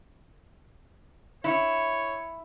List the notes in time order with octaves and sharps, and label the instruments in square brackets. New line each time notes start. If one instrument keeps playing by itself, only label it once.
[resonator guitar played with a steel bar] E4 [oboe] C#5